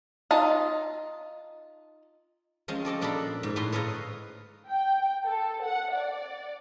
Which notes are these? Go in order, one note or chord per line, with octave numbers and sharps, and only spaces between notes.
D#4 F4 A5
F3 G#3 C4 C#4
A4 D5 D#5 A5
A#2 D4 A4 F5 A#5 B5
G#2
A2 B4 A#5 C6
A4 B4 C#5 D#5 F5 A#5
G5
A4
F#5
D5